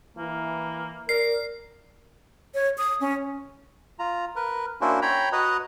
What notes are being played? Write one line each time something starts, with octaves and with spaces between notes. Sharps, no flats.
E3 A#3
A#4 D5 C7
C#5
D#6
C#4
F4 A#5
A#4 B4
A#3 C#4 D4 E4 F#4 C5
C#5 G5 A#5 B5
F#4 B4 D#5 F#5 A#5